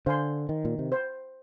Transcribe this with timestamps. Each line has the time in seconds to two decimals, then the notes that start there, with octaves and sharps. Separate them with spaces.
0.06 D3 C5 F5 G#5 C6
0.49 D#3
0.65 A#2
0.79 C3
0.92 C5